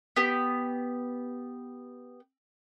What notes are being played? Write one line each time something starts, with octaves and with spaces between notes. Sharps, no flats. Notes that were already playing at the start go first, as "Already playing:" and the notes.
B3 G4